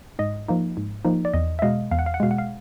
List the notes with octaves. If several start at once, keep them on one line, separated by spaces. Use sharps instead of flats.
G#2 D#5
F3 A#3 D#4
G#2
F3 A#3 D#4
D5
E2 D#5
E5
B2 G#3 D#5 F5
E2 F5
F#5
F5
F#5
B2 G#3 F5
F#5
F5